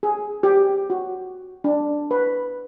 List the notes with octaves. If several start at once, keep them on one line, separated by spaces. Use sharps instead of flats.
G#4
G4
F#4
D4
B4